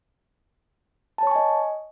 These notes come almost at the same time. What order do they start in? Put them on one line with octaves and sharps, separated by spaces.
A5 C#5 C#6 G#5 D#5